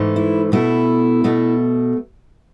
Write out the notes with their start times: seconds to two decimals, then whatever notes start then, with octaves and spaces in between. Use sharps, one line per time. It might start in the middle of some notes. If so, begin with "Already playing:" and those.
Already playing: G#2 E3 A3
0.16 E4
0.52 B2 A3 E4
1.24 B2 A3